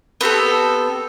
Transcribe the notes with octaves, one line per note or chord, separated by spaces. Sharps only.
B3 C4 G4 A4